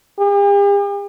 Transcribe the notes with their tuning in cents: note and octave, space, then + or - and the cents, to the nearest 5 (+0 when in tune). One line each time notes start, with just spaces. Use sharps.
G4 +45